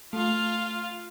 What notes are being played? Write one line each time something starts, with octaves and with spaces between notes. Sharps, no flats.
A3 F4 F5